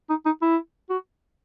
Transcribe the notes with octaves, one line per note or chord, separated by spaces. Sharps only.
D#4
D#4
E4
F#4